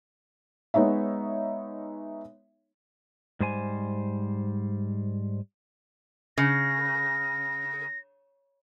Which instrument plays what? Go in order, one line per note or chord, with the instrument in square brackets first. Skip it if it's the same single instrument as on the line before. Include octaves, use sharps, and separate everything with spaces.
[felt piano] G#3 B3 D#4 C#5 E5
[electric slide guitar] G#2 G3 C5 G#5
[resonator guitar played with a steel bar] C#3 [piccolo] A#6